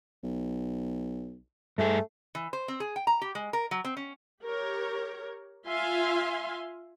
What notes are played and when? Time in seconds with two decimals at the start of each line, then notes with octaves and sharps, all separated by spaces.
0.24 B1
1.78 G2 A3 G#4
2.35 E3
2.53 C5
2.68 C4
2.80 G#4
2.96 G5
3.07 A#5
3.22 G4
3.35 G#3
3.53 A#4
3.71 F#3
3.85 C4
3.97 C#4
4.43 G4 A#4 C#5
5.68 F4 E5 F5 G#5 C6